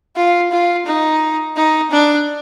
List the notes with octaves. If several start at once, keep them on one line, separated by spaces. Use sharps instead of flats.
F4
F4
D#4
D#4
D4